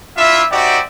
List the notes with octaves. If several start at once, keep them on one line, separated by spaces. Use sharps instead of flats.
D4 E4 F4 E5
C4 D#4 F#4 G4 D5 E5